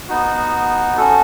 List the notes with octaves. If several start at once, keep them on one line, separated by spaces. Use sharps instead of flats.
B3 D#4 F#4
C#4 F#4 A4